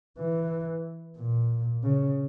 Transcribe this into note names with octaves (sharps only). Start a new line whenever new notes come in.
E3
A#2
C#3